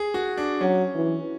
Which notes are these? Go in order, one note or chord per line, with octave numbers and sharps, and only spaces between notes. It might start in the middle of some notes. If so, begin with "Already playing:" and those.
Already playing: G#4
F#4
D4
F#3 C#4
E3